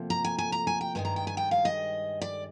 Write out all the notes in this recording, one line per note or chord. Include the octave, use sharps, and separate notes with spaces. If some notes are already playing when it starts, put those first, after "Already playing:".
Already playing: D2 C3 F3 A#3
A#5
G#5
G#5
A#5
G#5
G5
G2 D#3 G#3 G#5
A#5
G5
G#5
G5
F5
D#5
D5